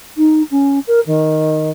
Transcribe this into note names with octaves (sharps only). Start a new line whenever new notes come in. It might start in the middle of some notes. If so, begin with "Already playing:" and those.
D#4
C#4
A#4
D#3